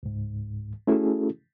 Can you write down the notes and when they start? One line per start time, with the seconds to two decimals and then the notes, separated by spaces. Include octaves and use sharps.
0.03 C#2 G#2
0.87 A3 C#4 E4 F#4 G#4 A4